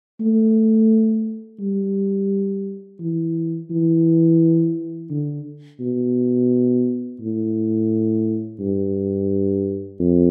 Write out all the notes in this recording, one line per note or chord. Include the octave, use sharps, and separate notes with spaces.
A3
G3
E3
E3
D3
B2
A2
G2
F2